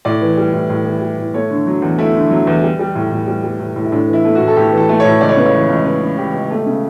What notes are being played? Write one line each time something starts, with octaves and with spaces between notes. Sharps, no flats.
A2 D5
E3
G3
A2
A2
E3
G3
A2
A3 C#5
D3
F#3
E2
A3 E4
D3
F#3
E2
G3
G3
A2
A2
G3
G3
A2
A2
E4
A2 D4
E3
E4
A3
F#4
A2
A4
A2 G4
E3 A4
A3
C#5
A2
C#2 D5
C#5
C#3 B4
C#5
E3
C#2
C#2 B4
C#3
E3 G4
C#2
A3 G4
C#3